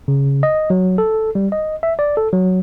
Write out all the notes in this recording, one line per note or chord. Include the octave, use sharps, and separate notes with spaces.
C#3
D#5
F#3
A4
G3
D#5
E5
D5
A4
F#3